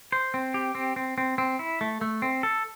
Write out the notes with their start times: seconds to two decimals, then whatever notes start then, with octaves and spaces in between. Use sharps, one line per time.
0.12 C5
0.34 C4
0.54 G4
0.75 C4
0.96 C4
1.18 C4
1.38 C4
1.59 E4
1.81 A3
2.01 A3
2.22 C4
2.43 A4